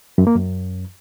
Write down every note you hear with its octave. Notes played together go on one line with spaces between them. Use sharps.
F#2
A#3
F#2